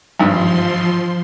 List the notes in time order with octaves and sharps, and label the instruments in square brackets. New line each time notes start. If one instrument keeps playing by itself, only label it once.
[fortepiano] G#1 G2 [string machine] F3 C6